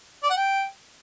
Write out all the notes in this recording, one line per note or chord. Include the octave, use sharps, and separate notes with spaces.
D5
F#5
G5